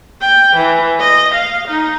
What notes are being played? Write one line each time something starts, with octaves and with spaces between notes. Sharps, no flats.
G5
E3
D#5
F5
D#4